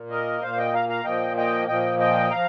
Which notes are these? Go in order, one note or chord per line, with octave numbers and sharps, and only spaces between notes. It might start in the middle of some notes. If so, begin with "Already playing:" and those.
Already playing: A#2 A#3
A#4 D#5
A#2 A#3 C5 F5
D#5 G5
F5 A#5
F5 A#5
A#2 F3 A#3 D#5 G5
D#5 G5
A#2 F3 A#3 D#5 G5
D#5 G5
F3 F5 A#5